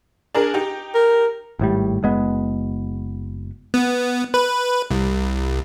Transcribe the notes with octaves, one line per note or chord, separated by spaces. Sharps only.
D4 G#4 A#4
D#4 G4
A#4
G#1 A2 G3
F#1 G#3 B3
B3
B4
C2